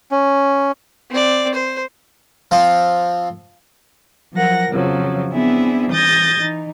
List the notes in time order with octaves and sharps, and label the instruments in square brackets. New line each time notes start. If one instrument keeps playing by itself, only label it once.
[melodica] C#4
[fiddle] C4 D5
C5
[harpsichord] F3 C4 F4
[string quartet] F3 F#3 A#4 F#5 A#6
F2 C#3 F3 F#3
B3 C4 D4 E4 G#4 E5
E3 D#6 G6 A6 A#6
E3 D#4